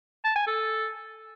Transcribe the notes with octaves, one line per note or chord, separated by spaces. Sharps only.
A5
G#5
A4